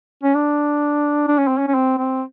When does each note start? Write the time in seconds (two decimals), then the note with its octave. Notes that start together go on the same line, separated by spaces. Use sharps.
0.23 C#4
0.35 D4
1.28 D4
1.38 C#4
1.47 C4
1.58 C#4
1.68 C#4
1.75 C4
1.98 C4